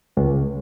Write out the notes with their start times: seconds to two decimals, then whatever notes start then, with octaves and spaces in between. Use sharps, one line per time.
0.17 C#2